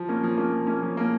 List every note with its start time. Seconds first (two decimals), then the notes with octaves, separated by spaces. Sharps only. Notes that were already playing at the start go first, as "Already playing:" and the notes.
Already playing: F3
0.08 A#3 C#4
0.24 F3
0.37 A#3 C#4
0.53 F3
0.67 A#3 C#4
0.82 F3
0.97 A#3 C#4